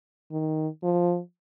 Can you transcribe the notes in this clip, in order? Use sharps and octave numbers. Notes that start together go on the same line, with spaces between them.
D#3
F3